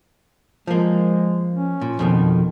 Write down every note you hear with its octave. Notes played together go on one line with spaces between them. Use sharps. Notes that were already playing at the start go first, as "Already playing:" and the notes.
F3 G#3 A#3
C#4
A#2
F2 B2 D#3